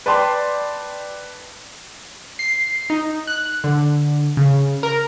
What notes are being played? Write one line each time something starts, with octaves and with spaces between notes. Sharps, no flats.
B4 D5 G5 A5 B5 C6
C7
D#4
F#6
D3
C#3
A#4